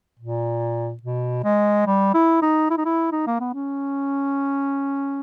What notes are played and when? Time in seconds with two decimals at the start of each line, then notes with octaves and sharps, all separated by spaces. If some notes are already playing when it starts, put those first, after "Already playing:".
0.19 A#2
1.03 B2
1.44 G#3
1.86 G3
2.14 E4
2.42 D#4
2.70 E4
2.77 D#4
2.85 E4
3.12 D#4
3.27 A#3
3.40 B3
3.54 C#4